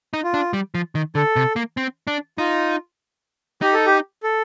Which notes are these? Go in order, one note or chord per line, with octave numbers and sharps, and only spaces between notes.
D#4
F4
D4
G3
F3
D#3
D3 A4
C3
A#3
C4
D4
D#4 F4
D#4 G4
A4
G4
A4